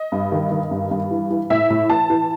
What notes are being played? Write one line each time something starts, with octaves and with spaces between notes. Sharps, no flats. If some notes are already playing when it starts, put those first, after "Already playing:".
Already playing: D#5
G2
D#3
D#3
G2
G2
E3
E3
A2 E5
A2
E3 A5
E3